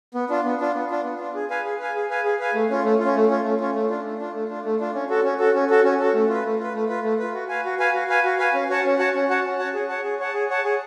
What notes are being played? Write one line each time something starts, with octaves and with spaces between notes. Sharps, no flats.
B3
D4 F4
B3
D4 F4
B3
D4 F4
B3
D4 F4
G#4
B4 F5 G#5
G#4
B4 F5 G#5
G#4
B4 F5 G#5
G#4
B4 F5 G#5
A3
C#4 F4
A3
F4
C#4
A3
C#4 F4
A3
C#4 F4
A3
D4 F4
A3
D4 F4
A3
D4 F4
A3
D4 F4
C#4
F#4 A4
C#4
F#4 A4
C#4
F#4 A4
C#4
F#4 A4
A3
F4 B4
A3
F4 B4
A3
F4 B4
A3
F4 B4
F#4
B4 F5 G#5
F#4
B4 F5 G#5
F#4
B4 F5 G#5
F#4
B4 F5 G#5
C#4
F#4 C#5 F#5 A5
C#4
F#4 C#5 F#5 A5
C#4
F#4 C#5 F#5 A5
C#4
F#4 C#5 F#5 A5
G#4
C#5 F#5 A5
G#4
C#5 F#5 A5
G#4
C#5 F#5 A5
G#4